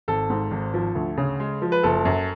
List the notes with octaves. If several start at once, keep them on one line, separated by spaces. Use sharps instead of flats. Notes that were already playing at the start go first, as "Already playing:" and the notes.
G#1 A4
G#2
G#1
F3
D2
C#3
G#3
F3
B4
F#1 A4
F#2